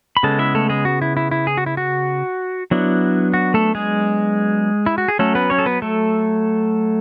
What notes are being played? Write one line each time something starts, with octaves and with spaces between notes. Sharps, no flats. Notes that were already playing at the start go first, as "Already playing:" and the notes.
B5
C#3 G#3 B3 A4 A5
E4 E5
A3 A4
G#3 G#4
F#4
E4
E4
E4
G#4
F#4
E4
F#4
F#3 B3 D4 E4
F#4
A3 A4
G#3 G#4
E4
F#4
G#4
F#3 A3 C#4 A4
B3 B4
C#4 C#5
A4
B3 B4
A3 A4